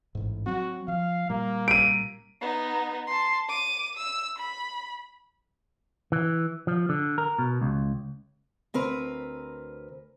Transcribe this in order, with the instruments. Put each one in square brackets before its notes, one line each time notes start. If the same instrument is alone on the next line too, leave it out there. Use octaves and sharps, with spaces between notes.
[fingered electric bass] A1 G#2
[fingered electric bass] F#3 C4 [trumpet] F#4
[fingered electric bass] F3 [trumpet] F5
[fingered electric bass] A#2 G3 [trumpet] A#3
[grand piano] D7 D#7
[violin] B3 D#4
A5 C6
D6 D#7
E6
B5
[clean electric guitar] E3
F3
D3
A#4
B2
C#2
[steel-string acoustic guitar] D2 C4 A#4 B4